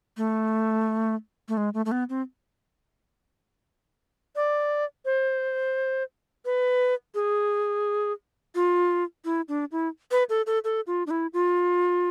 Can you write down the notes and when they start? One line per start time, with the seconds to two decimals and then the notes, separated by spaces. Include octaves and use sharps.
0.17 A3
1.49 A3
1.57 G#3
1.74 A3
1.86 A3
1.92 B3
2.10 C4
4.36 D5
5.05 C5
6.45 B4
7.15 G#4
8.55 F4
9.25 E4
9.48 D4
9.72 E4
10.11 B4
10.30 A4
10.47 A4
10.64 A4
10.87 F4
11.07 D4
11.11 E4
11.33 F4